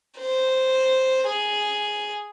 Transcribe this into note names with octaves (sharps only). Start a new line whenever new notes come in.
C5
G#4